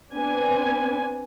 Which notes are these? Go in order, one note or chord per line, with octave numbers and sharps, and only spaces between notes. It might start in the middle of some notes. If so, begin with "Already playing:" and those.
B3 C4 D4 B4 G#5